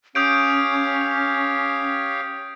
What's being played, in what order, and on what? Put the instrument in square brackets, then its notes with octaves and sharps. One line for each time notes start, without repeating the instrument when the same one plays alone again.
[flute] C#4 [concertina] G4 C#5 F5 [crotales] D#6 G6 D7